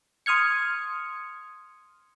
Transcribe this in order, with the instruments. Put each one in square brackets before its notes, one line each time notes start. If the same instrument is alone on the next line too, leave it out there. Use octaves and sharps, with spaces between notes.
[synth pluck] C6 D#6 F6 G#6 C#7